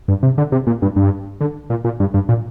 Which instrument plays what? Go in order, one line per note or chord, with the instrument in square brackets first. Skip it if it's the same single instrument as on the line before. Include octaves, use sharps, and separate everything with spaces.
[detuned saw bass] G2
C3
D3
C3
A#2
G2
G2
D3
A#2
A#2
G2
G2
A#2